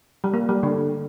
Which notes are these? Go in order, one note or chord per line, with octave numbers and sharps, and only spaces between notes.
G3
A#3
G3
D3